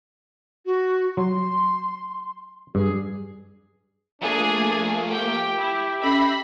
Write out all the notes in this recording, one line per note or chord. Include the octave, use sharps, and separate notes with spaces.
F#4
F#3 C6
G2 G#4
F3 A3 A#3 D4 G#4
G4 G5
E4 D6
C#4 A4 D#5 E5 B5 A#6 C7